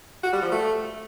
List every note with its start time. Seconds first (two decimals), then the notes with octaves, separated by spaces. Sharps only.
0.23 F#4
0.33 G3
0.42 F3
0.51 A3